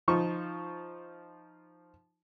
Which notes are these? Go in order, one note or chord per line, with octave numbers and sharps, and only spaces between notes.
F3 D#4 F4 C#6